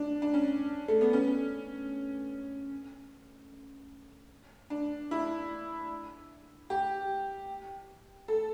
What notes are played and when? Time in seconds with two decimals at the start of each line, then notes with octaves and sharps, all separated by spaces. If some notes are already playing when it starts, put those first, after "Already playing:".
Already playing: D4
0.22 D4
0.34 C#4
0.88 A3
1.01 B3
1.13 C#4
4.70 D4
5.11 E4
6.70 G4
8.28 A4